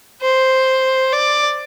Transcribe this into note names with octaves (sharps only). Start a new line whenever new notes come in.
C5
D5